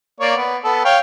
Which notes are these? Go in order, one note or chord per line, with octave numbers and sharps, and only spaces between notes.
A#3 C#5 D5
B3
B3 A4
C#5 F5 G5